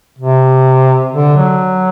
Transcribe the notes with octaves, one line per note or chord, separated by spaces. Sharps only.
C3
D3
F#3